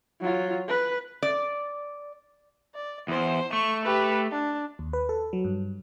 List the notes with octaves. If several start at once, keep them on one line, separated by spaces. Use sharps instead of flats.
F#3 F4
B4
D5
D5
E2 C5
A3 C#6
G4 B4
D4
D#2
B4
A4
F#3
G2